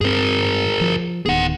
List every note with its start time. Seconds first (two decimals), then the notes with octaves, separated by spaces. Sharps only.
0.01 G2 C4 G#4 A#4
0.81 F3
1.26 D1 D#3 B3 G#4 F#5